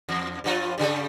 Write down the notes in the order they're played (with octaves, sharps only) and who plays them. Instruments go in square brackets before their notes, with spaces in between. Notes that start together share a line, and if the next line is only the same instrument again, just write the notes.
[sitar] E2
G2 F3 F4
G2 C#3 G3